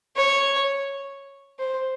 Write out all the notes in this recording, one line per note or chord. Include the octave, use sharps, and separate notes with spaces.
C#5
C5